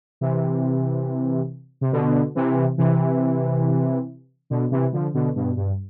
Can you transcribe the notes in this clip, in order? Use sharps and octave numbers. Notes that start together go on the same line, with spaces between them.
C3 E3
C3
B2 D3
C3 E3
C3 E3
B2 D3
C3 E3
D3 F3
B2 D3
G2 B2
G2